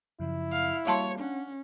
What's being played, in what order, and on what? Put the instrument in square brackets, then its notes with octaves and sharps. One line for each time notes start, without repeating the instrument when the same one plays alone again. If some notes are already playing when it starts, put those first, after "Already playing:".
[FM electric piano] F#2 C#3 F3 [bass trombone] E4
[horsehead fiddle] F5
[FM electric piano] G3 A#3 F#4 [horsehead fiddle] C#5 [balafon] F5 A5 C6
[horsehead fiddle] C#4 [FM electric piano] D4 F#5